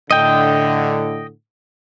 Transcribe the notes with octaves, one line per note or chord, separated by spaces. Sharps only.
A2 D3 D#5 G5